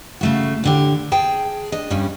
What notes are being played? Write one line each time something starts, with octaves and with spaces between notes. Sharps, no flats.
C#3 A3 F#4
A2 D3 G4
G#4 G5 A5
D4 D#5
G2 G3 C#4